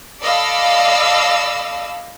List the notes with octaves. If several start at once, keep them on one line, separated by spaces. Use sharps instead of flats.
A4 D5 D#5 F5 B5 E6